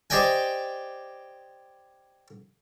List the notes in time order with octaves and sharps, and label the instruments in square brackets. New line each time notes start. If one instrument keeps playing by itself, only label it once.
[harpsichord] G4 C5 D5 D#5 G5 G#5